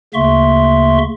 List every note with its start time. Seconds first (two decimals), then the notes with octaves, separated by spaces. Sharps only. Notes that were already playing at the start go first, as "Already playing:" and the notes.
0.14 D2 C#3 A#3 E5 C6 C#6